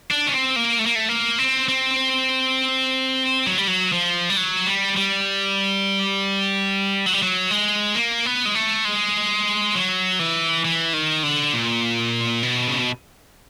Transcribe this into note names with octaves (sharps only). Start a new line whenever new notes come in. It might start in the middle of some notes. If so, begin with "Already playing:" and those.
D4
C#4
C4
A#3
A3
A#3
A3
A#3
C4
C4
F#3
G3
F#3
F3
G3
F#3
G3
G3
F#3
G3
F#3
G#3
A#3
B3
G#3
A3
G#3
F#3
E3
E3
D#3
D3
A#2
B2
C#3